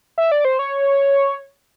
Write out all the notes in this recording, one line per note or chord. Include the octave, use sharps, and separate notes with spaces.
E5
D5
C5
C#5